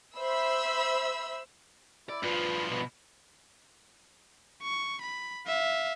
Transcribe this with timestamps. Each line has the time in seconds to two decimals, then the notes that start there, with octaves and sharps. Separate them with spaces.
0.18 C5 E5 B5 E6
2.09 E4 D5
2.24 G2 F3 F4 B4
2.71 B2 B4
4.63 C#6
5.01 B5
5.47 E5 F5